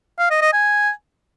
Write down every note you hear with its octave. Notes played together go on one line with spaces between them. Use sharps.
F5
D#5
D#5
G#5